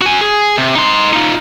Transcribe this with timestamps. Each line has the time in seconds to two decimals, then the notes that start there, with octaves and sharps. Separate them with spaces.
0.02 F#4 G#5
0.21 G#4
0.58 C3
0.75 D#4 C6
1.13 D#4 F4